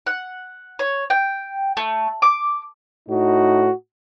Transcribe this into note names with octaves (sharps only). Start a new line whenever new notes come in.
F#5
C#5
G5
A3
D6
A2 D#4 F#4